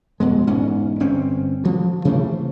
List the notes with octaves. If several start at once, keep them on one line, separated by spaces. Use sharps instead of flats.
F2 B2 G#3
E1 G#2 C#4
G1 C4 C#4
D2 F3
C3 E3 A3 A#3